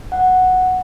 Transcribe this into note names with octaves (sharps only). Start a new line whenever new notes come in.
F#5